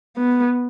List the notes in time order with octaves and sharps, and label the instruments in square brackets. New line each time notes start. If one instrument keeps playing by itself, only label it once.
[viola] B3